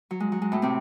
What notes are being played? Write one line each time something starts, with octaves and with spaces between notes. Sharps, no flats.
F#3
G#3
F#3
G#3
A2 A3
C3 C4